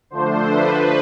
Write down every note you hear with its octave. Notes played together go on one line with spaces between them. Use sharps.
D3 F3 A3 D4 C5
B4